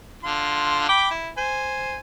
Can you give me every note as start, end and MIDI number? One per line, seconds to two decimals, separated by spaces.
0.24 0.87 50
0.24 0.87 65
0.24 0.87 84
0.89 1.09 79
0.89 1.09 83
0.89 1.09 86
1.11 1.29 64
1.38 1.98 72
1.38 1.98 80